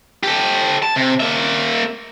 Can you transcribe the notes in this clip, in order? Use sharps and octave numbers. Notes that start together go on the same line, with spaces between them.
G4 A4
A5
C3
A#3 E5